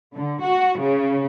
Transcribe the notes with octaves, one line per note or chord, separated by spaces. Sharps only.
D3
F#4
C#3